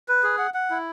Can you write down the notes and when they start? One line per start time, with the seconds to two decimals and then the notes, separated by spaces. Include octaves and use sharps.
0.08 B4
0.23 G#4
0.38 F#5
0.54 F#5
0.70 E4